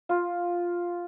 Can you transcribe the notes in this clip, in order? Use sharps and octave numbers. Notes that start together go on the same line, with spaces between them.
F4